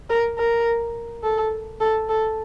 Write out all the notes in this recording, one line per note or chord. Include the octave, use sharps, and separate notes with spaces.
A#4
A#4
A4
A4
A4